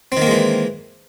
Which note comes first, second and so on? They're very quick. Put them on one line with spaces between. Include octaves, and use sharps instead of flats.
C4 D#3 A#3 G#3 E3